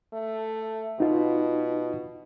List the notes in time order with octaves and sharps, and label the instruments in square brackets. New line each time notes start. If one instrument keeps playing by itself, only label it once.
[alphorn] A3
[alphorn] B2 [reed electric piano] D#4 F4